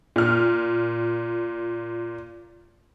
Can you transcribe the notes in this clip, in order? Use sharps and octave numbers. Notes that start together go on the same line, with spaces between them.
A#2 F6